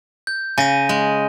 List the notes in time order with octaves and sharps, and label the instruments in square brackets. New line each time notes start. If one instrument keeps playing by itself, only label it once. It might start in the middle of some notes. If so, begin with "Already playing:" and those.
[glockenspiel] G6
[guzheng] C#3 [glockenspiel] G#5 A#6 D#7
[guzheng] G#3